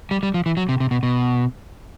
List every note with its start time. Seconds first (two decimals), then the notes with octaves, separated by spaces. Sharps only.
0.11 G3
0.23 G3
0.34 F3
0.46 E3
0.57 F#3
0.69 C3
0.80 C3
0.91 B2
1.03 B2